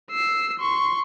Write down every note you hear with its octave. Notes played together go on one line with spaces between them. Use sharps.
E6 C7
C6 C#6